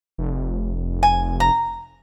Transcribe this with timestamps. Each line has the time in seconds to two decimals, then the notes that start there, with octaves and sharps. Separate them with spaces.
0.18 F1
1.03 G#5
1.40 A#5